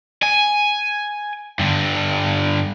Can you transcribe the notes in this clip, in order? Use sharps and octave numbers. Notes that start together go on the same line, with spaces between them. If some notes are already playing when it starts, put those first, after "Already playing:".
G#5
G2 D3